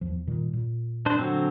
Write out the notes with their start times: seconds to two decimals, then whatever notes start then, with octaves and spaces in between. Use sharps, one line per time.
0.01 E2 F3
0.27 A#2 D#3 G3
0.53 A#2
1.06 D4 C5
1.19 D3 F#3 C4